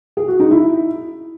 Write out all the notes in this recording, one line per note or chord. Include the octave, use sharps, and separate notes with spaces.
G#4
F#4
D#4
E4